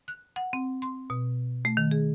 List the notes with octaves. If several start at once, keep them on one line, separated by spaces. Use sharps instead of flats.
F#6
F#5
C4
C6
B2
A3
D#3
G#4